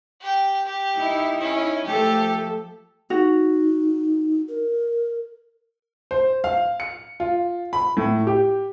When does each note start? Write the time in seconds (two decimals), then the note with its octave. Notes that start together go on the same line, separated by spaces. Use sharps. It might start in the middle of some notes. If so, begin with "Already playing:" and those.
0.21 G4 G5
0.66 G4
0.98 D#4 E4
1.40 C#4
1.87 F3 A3 G4 A4
3.10 D#4 F#4
4.48 A#4
6.11 C5
6.44 F5
6.80 C#7
7.20 F4
7.73 B5
7.97 A2
8.27 G4